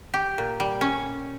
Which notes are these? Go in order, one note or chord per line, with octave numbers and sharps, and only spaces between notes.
G4
A#2
G3
C#4